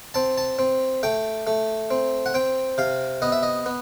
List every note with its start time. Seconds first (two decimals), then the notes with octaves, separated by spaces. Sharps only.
0.14 C4 A5
0.37 A5
0.59 C4
1.03 A3 G5
1.47 A3
1.91 C4
2.26 F#5
2.34 C4 G5
2.78 C3 F5
3.22 B3 D#5
3.32 E5
3.43 D#5
3.66 B3